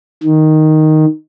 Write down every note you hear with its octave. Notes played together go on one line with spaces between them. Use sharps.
D#3